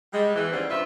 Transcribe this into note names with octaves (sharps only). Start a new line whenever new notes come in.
G3 G#3
E2 E3
D#2 C#3 E3 G3 B3 C5
G2 C3 C4 F4 B4 E5